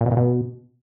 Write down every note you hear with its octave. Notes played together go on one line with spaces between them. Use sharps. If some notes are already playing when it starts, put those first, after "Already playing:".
A#2
B2
A#2
B2